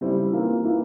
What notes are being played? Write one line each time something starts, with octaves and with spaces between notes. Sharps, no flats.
C#3 G3 C4 E4
E3 A#3 F4
E3 A#3 E4